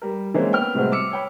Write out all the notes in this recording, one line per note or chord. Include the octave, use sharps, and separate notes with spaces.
G3 A#4
E3 G#3 A#3 C4 C#4
B3 G5 F6
A2 C3 G3 G#3 F#4 C5
D6 E6 C#7
C#5 G5 B5